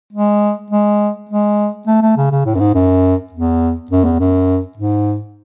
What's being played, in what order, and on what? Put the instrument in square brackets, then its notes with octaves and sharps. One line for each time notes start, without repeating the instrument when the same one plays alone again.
[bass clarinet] G#3
G#3
G#3
A3
A3
C#3
C#3
A2
F#2
G#2
F#2
E2
F#2
E2
F#2
G#2